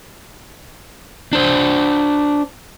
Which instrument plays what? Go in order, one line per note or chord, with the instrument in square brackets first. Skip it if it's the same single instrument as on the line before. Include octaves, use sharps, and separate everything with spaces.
[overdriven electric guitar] D4 C5